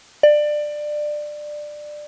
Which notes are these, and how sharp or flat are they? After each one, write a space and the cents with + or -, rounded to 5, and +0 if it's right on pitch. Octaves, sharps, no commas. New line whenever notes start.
D5 +20